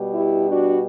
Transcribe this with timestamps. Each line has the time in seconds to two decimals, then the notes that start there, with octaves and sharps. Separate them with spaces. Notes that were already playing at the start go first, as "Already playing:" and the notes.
Already playing: B2 G3
0.13 E4 G4
0.47 D4 F#4